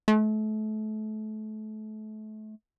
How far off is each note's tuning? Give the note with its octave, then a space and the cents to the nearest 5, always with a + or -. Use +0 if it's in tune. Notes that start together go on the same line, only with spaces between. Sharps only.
A3 -30